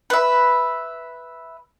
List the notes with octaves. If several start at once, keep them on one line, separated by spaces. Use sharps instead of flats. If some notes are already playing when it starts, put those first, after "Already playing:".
B4 E5